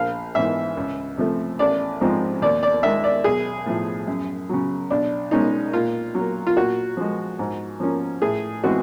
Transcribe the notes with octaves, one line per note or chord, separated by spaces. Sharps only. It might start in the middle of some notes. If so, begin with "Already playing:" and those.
Already playing: A#1 F5
G#2 E3 E5
C#2
C3 F3 A3
A1 D5
G#2 F3 G#3 C4
D#2 D5
D5
D#3 G#3 E5
D5
B1 G#4
A2 F3
F#2
C#3 F#3
B1 D4
B2 G#3 C#4 D#4
A#2 F4
F#3 A#3
F4
A#2 F#4
F3 G#3
G#2
F3 A#3 C#4
A2 G#4
E3 G#3 C4 F#4